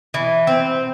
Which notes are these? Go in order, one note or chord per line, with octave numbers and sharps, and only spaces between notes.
E3
C4